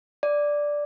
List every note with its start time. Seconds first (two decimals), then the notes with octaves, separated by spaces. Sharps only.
0.23 D5